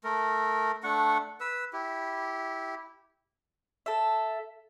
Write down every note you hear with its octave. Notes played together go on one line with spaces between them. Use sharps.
A3 A#4
A3 D4 F#5 C#6
B4 E6
E4 G4
A4 E5